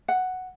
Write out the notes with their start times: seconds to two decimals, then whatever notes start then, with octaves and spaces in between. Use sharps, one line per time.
0.08 F#5